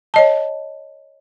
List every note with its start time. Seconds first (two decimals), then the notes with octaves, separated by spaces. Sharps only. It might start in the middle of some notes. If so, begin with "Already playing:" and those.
0.14 C#5 D#5 A5